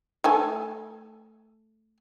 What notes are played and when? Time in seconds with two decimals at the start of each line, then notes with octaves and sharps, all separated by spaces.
0.24 A3 A4 G#5